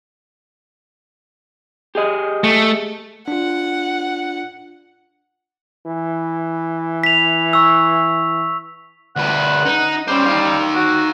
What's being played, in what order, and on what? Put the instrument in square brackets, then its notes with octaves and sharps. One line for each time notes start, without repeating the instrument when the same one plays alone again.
[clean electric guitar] G4 G#4 D#5
[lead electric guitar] A3
[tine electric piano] D4 F4 [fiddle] F#5
[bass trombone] E3
[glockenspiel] B6 F7
C#6 E6
[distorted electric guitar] D2 B4 [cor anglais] F#5
[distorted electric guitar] D#4
[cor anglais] G3 [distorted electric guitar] C#4 C5
[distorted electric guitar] D#4 F5
[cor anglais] F#4